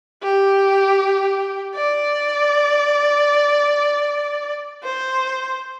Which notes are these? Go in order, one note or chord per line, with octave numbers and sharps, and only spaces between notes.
G4
D5
C5